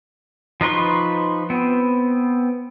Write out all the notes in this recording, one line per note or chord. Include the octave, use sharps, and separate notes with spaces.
F3 D#4 B4 C6 C#6
B3 C4